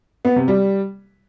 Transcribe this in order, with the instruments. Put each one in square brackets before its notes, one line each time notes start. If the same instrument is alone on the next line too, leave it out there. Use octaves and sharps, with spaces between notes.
[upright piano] B3
C3
G3